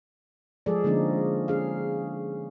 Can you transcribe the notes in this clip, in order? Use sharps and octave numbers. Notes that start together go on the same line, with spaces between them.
F3 G#3 G#4 A4 D5
D3 F3 G#3 A#3 C#4 D#4
C#4 G#4 F5